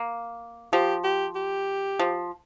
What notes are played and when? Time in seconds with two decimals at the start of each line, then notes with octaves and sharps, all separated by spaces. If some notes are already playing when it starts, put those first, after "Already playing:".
Already playing: A#3
0.73 F3 G4
1.04 G4
1.36 G4
1.99 F3